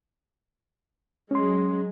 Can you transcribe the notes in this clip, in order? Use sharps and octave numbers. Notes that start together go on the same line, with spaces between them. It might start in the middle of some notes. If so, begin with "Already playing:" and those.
F#3 G#3 C#4 C6